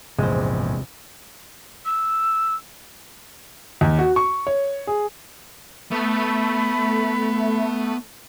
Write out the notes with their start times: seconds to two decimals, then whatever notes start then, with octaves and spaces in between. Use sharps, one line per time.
0.19 A#1 E2 G#2 C3 G#3 C5
1.86 E6
3.81 D#2
3.99 F#4
4.16 C#6
4.47 C#5
4.87 G#4
5.91 A3 B3 B5